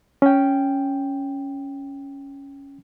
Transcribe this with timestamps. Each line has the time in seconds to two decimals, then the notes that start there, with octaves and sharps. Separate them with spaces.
0.22 C#4 G5